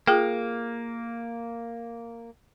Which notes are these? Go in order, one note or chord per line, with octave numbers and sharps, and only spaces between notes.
A#3 F4 G#4 G5